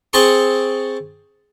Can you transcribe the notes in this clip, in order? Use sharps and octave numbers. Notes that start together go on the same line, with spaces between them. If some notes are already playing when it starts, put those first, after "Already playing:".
C4 G#4 A5 C6 C#6